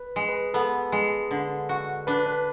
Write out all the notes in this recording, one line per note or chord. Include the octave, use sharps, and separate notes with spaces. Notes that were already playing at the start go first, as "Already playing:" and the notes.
Already playing: B4
G#3
B4
B3 A4
G#3
D3
F#4
D4 B4
B4